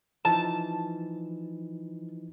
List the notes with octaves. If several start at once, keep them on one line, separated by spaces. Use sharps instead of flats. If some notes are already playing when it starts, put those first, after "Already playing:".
E3 F3 D#4 A5